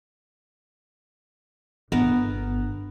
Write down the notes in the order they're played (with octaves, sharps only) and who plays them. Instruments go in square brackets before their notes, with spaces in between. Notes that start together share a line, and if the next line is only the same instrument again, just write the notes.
[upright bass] G1 [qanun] B3 A#4